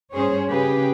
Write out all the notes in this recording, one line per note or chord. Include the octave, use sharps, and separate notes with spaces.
G2 C#4 G#4 C5 C#5
C#3 G4 G#4 B4